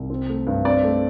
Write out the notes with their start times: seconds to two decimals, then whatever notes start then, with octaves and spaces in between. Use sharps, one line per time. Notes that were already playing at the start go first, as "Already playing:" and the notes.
Already playing: C2
0.10 C4
0.28 A3
0.47 G2
0.65 C4 D5
0.83 A3